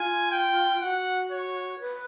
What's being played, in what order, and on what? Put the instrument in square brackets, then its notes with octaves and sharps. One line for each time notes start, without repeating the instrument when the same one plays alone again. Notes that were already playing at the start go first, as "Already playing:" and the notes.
Already playing: [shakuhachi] F4 [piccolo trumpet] G#5
[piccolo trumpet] G5
[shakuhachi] F#4 [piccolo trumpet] F#5
[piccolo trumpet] C#5
[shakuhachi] B4